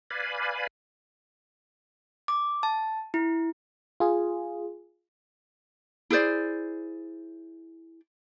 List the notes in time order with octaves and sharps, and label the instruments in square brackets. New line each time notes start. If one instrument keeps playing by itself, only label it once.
[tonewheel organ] B4 D5 F5 G#5 B5
[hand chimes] D6
A5
E4
[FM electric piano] F4 G#4
[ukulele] E4 G#4 C5 D5